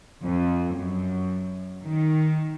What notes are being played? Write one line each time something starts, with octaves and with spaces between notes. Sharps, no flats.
F2
F#2
D#3